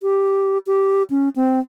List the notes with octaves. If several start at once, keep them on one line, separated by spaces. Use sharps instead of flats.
G4
G4
C#4
C4